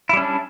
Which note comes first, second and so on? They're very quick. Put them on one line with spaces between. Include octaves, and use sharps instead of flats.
E4 G3 C#4 D4